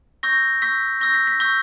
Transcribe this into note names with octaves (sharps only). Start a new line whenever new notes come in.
C#6 E6 G6 A#6
C#6 E6 G6 B6
C#6 E6 G6 A#6
B6
B6
C#6 E6 G6